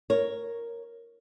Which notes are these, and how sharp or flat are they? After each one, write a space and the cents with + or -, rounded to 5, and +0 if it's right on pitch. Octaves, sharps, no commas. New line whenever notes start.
A#4 +0 C#5 +0